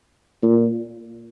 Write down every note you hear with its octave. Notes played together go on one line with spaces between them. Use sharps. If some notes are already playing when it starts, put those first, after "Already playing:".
A#2